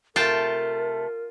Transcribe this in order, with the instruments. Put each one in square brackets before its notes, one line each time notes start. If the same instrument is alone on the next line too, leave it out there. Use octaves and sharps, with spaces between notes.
[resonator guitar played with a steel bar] C3 A3 [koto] F4 G5 A5 [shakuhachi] A#4